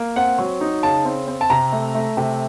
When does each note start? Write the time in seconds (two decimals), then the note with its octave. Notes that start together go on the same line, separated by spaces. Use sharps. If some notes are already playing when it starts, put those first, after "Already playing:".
Already playing: A#3
0.16 C4 F#5
0.38 F#3
0.61 D#4
0.83 C#3 A5
1.05 C4
1.27 C4
1.41 A5
1.50 C3 A#5
1.72 A3
1.95 A3
2.17 C3